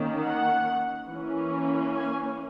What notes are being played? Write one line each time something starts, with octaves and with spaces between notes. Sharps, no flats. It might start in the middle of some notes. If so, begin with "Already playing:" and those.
Already playing: D#3 A#3 C#4
F#5
E3 A#3 C#4
G#5